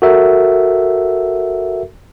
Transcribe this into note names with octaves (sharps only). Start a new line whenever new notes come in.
F#4 A4 A#4 E5